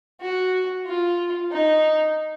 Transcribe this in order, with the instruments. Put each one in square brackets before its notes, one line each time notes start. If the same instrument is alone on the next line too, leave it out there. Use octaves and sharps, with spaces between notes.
[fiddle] F#4
F4
D#4